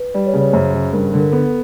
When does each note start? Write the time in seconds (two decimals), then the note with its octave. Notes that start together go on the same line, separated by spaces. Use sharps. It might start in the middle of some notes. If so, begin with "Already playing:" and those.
Already playing: B4
0.14 G3 D5
0.27 C#5
0.33 C#3
0.40 C#5
0.53 F#2 C5
0.74 C#3
0.93 G2 A#4
1.13 D3
1.20 A#4
1.32 B3 A4